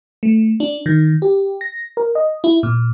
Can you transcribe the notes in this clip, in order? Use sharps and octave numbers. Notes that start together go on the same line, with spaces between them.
A3
D4
D#3
G4
A#6
A#4
D#5
E4
A#2